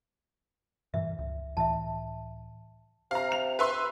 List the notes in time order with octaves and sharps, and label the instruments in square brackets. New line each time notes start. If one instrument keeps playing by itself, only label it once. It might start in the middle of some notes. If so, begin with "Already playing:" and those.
[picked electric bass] G2 A#2 E3 [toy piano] E5
[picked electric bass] C#2
[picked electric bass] C#2 A2 E3 [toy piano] E5 A5
[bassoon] C3 [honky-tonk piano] F5 A#5
[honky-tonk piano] F7
B4 E5 C6